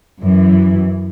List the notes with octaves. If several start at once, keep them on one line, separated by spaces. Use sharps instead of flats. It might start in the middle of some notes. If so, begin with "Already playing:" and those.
F#2 E3